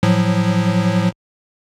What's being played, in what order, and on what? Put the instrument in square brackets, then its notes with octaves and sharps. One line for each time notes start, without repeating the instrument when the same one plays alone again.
[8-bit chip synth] A2 F3 F#3